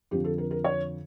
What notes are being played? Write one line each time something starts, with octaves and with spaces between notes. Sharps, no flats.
F2 D3 F3 G4
A4
A#4
A#4
C#5